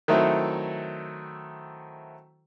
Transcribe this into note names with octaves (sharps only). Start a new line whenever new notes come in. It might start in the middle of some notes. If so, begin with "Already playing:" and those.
D#3 F#3 A3 C4 E4 A4